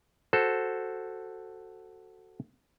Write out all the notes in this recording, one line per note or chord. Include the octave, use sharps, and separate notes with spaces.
F#4 A4 C5